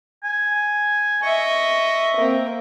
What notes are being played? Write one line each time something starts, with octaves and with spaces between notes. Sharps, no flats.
G#5
D#5 E5 C#6
A#3 C4